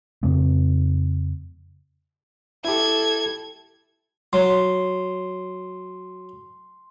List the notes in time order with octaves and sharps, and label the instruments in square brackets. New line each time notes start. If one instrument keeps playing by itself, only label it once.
[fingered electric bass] F2 C#3 A3 C4
[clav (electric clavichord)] E4 G4 [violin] A4 G#6
[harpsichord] F#3 [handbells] C6